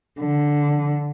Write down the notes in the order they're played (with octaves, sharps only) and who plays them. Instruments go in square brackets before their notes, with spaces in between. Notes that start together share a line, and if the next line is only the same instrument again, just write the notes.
[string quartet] D3